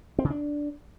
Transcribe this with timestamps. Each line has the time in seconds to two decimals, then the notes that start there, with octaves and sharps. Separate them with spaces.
0.19 C4
0.25 C#3
0.30 D4